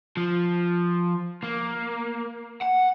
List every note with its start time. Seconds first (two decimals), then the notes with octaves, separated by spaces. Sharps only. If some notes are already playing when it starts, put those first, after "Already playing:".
0.17 F3
1.44 A#3
2.62 F#5